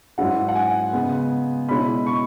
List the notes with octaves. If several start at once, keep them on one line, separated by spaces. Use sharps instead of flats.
G#2 F#3 C#4 E4 F#5
F#5
G#5
C#3 G#3 B3
B2 G#3 C#4 E4 B5
C#6